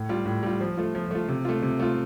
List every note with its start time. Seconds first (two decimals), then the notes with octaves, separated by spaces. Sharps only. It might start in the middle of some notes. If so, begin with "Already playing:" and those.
Already playing: A2
0.09 G3 F4
0.26 A2
0.43 G3 F4
0.61 F3
0.77 A3 F4
0.95 F3
1.11 A3 F4
1.28 C3
1.45 A3 F4
1.62 C3
1.79 A3 F4